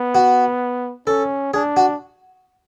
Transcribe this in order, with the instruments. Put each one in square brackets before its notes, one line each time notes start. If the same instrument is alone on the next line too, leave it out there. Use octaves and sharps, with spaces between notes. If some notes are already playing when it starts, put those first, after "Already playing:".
Already playing: [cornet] B3
[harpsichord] F#4
[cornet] C#4 [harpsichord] A4
[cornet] D4 [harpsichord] G#4
[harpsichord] F#4